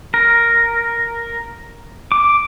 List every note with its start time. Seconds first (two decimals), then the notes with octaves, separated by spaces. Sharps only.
0.14 A#4
2.12 D6